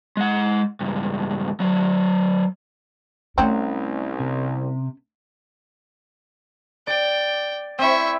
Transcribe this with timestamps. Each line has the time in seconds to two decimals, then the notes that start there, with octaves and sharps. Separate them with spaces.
0.17 G#3 F#5
0.81 C#2 G2
1.60 F#3 A3
3.38 C2 F#3 A3 C4 C#4
4.20 C3
6.87 D5 G5
7.79 C4 E4 E5 C#6